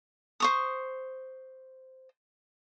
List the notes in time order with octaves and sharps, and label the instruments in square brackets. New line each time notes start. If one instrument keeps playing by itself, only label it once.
[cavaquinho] C5 C#6 D#6